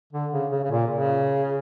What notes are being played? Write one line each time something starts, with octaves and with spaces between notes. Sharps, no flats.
D3
C#3
C#3
C#3
A#2
C#3